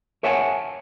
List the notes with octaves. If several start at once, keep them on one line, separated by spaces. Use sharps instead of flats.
A#4 C#5 E5 F#5 G#5 A5